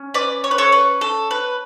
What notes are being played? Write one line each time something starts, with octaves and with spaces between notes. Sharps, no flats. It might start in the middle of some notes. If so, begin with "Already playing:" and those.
Already playing: C#4
B4 D5
C#5
B4
A4 C#5
B4
A4
B4